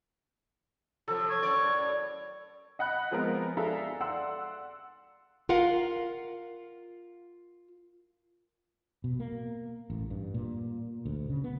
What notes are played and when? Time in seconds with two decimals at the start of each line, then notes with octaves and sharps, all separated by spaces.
1.08 C3 F3 F#3 A4
1.30 C#5
1.43 F#2 A2 D5
2.79 D#5 F#5 B5 F#6
3.11 F3 G#3 B3 C4 A#4
3.57 G#4 A4 D5 E5 F5 A#5
4.01 D5 F#5 C6 E6
5.49 F4 A#4 F5 F#5
9.04 B2
9.20 A#3
9.90 A1
10.10 G2
10.34 A#2
11.05 D2
11.29 C#3
11.44 B3